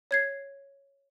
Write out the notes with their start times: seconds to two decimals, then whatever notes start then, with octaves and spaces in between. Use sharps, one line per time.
0.11 C#5 G#6 C7